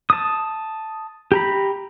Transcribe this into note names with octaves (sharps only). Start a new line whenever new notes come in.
A5 D#6
G4 A#5 B5